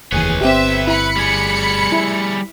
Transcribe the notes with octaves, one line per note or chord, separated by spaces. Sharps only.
F1 D#2 E3 G#4 B4 C#5
G1 C4 G4 E5
E4 B5 C#7
G3 G#4
E4